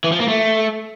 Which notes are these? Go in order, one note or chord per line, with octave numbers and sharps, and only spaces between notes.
E3
F3
A#3
A3